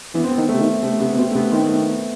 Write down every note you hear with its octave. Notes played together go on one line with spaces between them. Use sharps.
E3 B3
C4
B3
D#3
A3
C3
D#3
C3 A3
C3 B3
C3
B2 C4
A3
C3 B3
D#3 C4
B3
A3
B3